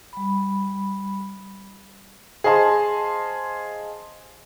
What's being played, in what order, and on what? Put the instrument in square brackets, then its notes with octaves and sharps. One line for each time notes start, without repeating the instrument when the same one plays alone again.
[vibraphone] G3 B5
[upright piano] G#4 C5 D#5 F5 A5 C6